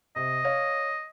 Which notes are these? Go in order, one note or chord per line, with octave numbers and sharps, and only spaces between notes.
C3 D#5
C#5 F5